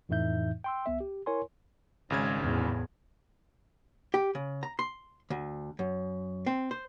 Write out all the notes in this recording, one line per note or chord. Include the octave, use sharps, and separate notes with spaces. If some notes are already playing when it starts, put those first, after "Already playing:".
F2 A2 E3 D#4 E5 G6
G5 C6 E6
C2 B3 E5
G4
E4 A#4 C#5 G#5 C6
G#1 C#3 G#3 G#6
E2 A2
G4
C#3
A#5
C6
D2
F#2
C4
C5